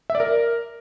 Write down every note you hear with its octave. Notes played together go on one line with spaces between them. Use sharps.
E5
D5
A#4